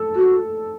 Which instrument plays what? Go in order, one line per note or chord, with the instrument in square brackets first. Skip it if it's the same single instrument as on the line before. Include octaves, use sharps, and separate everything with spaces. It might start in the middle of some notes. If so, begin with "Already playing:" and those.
Already playing: [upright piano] A4
[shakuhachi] F#4